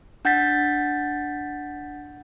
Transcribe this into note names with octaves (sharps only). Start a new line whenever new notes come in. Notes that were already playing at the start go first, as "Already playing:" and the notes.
D4 F#5 G6 A6 B6